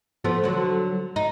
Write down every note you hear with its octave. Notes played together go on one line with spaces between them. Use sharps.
F3 A3 B3
D3 F#3
D#4